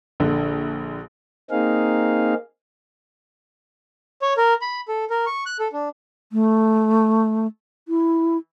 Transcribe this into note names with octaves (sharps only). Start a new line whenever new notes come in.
A#1 D3
A#3 C4 D#4 G#4 F5
C#5
A#4
B5
A4
A#4
C#6
F#6
A4
D4
A3
E4